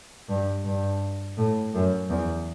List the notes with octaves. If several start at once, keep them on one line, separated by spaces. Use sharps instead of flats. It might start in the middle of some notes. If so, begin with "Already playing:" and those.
G2
G2
A2
F#2
E2